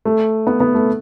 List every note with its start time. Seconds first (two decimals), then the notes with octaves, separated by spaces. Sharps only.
0.05 A3
0.47 B3
0.60 B3
0.74 A3